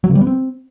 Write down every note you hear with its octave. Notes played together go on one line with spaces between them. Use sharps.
F#3
C#3
G3
B3
C4